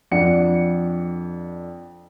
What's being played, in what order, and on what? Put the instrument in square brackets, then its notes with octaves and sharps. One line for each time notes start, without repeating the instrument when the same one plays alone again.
[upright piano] F2 D4 F#5 C#7